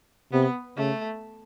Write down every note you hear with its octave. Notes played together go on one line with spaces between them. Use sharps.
C3 B3
C#3 A3